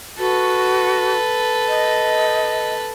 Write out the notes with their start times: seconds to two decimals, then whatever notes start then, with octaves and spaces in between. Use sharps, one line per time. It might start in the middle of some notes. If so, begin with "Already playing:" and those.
0.19 F#4 A4 B4
1.69 D#5